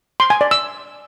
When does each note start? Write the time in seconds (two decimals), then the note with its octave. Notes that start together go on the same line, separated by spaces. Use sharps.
0.20 C6
0.30 G#5
0.41 D5
0.51 E6